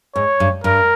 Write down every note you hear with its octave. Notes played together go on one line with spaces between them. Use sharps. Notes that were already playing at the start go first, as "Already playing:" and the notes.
G#2 C#5
G2
G2 A#4